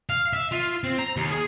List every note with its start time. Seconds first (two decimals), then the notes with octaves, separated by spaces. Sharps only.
0.09 F5
0.33 E5
0.52 F4
0.84 C4
0.99 A#5
1.17 D#2
1.31 G#4